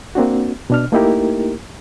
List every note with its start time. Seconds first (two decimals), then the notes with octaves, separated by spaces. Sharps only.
0.15 A#3 C4 D4 F#4
0.70 B2 D4 F6
0.92 A3 A#3 D#4 E4 G4 A#4